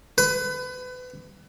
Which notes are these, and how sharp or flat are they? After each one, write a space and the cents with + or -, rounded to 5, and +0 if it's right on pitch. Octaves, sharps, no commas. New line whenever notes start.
B4 +30